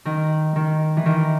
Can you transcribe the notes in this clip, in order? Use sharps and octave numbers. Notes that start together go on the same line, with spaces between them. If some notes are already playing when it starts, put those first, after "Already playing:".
D#3
D#3
E3
D#3